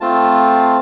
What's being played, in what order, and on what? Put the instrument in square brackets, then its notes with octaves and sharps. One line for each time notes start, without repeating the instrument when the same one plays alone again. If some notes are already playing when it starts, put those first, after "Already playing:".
[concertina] A3 C4 F4 A5